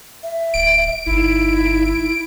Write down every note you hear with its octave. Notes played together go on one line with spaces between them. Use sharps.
E5
D1 D7
G1 D#4 E4